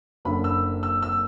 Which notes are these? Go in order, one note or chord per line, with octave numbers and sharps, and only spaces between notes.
F#1 F#2 D3 B5
E6
E6
E6